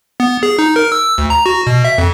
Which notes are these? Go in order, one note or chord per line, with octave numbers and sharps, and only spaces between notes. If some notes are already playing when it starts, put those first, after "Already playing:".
B3
G#4
D#4
A#4
E6
D2
A#5
F#4
B2
E5
F2